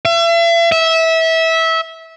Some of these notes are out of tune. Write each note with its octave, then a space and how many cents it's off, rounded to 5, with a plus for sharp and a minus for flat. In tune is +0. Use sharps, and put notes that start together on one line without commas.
E5 +40
E5 -20